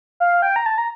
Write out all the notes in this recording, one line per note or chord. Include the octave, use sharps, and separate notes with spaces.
F5
G5
A#5
A5
A#5